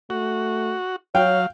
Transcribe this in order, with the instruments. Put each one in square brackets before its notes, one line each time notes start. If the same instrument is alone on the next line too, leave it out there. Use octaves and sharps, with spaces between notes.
[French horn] A3 [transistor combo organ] F#4
[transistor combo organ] F#3 [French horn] C#5 [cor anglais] F5 [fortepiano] G5